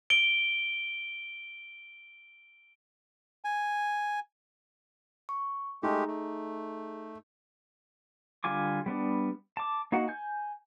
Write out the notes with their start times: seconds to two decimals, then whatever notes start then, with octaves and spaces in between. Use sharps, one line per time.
0.10 D7 G7
3.45 G#5
5.29 C#6
5.83 G#3 A3 D#4 G4 G#4
6.08 A3
8.44 D3 G3 F4 G#5 D6
8.86 G3 B3 D4
9.57 A5 D6
9.92 A#3 D#4 F#4 F#5
10.08 G#5 G6